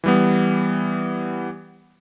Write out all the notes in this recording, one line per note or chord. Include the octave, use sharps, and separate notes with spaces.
E3 G3 B3